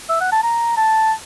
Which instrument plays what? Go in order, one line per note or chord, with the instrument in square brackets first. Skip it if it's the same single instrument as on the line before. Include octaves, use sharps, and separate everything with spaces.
[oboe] E5
F#5
A5
A#5
A5